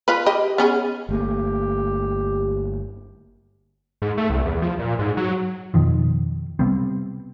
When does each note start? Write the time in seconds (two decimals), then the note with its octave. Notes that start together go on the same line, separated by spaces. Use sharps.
0.08 F4 B4
0.26 G4 D#5
0.58 B3 C#4 G#4
1.09 G1 A3 A#3 G4
4.02 G#2
4.18 A3
4.30 C2
4.45 E2
4.62 F3
4.79 A#2
4.99 G#2
5.17 F#3
5.74 F2 B2 D#3 F3
6.59 C3 G3 B3 C4